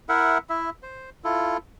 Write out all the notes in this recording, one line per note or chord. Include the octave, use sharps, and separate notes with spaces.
E4 A#4 E5 F#5
E4 E5
C5
E4 F4 A4